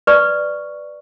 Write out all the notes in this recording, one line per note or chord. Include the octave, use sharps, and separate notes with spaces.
B4 D5 C#6